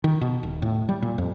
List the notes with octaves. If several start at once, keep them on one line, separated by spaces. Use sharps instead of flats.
D#3
B2
D#1
A2
G3
A#2
F2